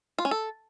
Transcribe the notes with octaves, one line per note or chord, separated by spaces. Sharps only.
F4
C#4
A4